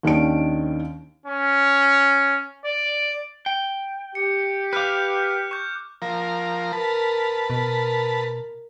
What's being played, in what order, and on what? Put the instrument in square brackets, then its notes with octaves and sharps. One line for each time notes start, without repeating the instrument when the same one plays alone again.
[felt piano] D#2 D#3 C#4 D4 D7
[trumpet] C#4
D5
[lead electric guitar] G5
[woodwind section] G4 [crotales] C#7
[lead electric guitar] B4 F5 [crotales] D6 F6 F#6
[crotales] C#6 G6
[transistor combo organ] F3 A#4
[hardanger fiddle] A#4 [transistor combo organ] B4 A5
[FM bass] B2 [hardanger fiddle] A#4